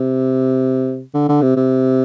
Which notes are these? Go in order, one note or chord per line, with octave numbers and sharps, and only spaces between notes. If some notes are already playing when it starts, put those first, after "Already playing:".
Already playing: C3
D3
D3
C3
C3